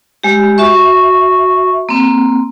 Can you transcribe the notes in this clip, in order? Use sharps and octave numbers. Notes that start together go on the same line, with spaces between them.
G#3 G4
F#4 E5 C#6
A#3 C4